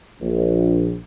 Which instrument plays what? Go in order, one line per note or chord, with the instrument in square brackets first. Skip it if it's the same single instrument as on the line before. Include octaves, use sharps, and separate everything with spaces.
[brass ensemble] A#1